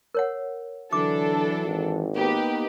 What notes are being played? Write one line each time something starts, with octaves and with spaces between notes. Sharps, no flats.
A#4 C#5 F#5
D3 E3 F#3 D4 E4 A4 D6
G#1 E3
A#3 B3 D#4 G4 B4